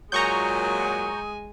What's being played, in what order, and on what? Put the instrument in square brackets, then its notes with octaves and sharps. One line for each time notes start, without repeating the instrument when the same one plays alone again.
[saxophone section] A#2 F#3 [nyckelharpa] G#3 G#5 [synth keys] A#5 C#6 G6 [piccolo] D#6